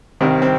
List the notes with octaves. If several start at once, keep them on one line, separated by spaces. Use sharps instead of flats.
C2 C3 D#3 C4
C4